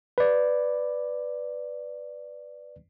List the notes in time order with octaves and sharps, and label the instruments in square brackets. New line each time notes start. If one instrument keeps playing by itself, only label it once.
[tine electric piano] B4 D5